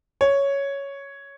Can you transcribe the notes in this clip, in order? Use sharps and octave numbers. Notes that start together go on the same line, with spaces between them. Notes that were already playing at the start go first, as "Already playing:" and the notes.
C#5